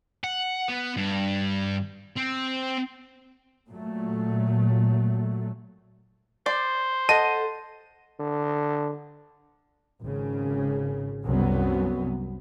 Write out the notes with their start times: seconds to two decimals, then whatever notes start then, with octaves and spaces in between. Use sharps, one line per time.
0.24 F#5
0.68 B3
0.97 G2
2.17 C4
3.70 A#2 F#3 A3
6.46 C5 D5
7.09 A4 D#5 F#5 A5 D#7
8.20 D3
10.02 G#1 C#3
11.26 C2 F#2 F#3 B3